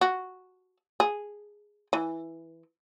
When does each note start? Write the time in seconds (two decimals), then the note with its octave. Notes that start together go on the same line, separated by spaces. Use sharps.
0.01 F#4
1.00 G#4
1.93 E3